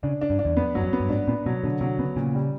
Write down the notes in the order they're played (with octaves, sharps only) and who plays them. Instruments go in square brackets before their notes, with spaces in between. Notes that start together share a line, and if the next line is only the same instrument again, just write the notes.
[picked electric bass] C#3 [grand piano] D4
[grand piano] D4
[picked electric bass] G2
[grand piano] D4
[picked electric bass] E2
[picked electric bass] F2 [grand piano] B3
[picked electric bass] G2 [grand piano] F#3
[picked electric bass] F#2
[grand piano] B3
[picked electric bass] G2
[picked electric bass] G#2 [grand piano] D4
[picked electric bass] A#2 [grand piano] B3
[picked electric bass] B2 [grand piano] F#3
[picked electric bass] B2 [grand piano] D3
[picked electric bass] C3 [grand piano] F#3
[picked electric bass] C#3 [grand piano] B3
[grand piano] A#2 [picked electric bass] C#3
[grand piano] G3